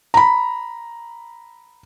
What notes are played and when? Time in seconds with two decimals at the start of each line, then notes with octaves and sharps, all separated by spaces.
0.14 A#5 B5